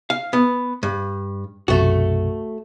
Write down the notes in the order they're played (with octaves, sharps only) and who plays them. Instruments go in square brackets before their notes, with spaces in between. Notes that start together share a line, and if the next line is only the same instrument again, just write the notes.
[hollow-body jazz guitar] F5
B3
G2
[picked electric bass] B1 F#2 C3 [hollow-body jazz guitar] A3 F#4